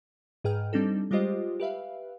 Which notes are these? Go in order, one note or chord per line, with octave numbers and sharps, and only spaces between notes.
G#2 G#4 B4 G5 F6
G3 C4 D4 D#4 A4
G3 G#3 F4 G4 C5 D#5
G4 B4 E5 F5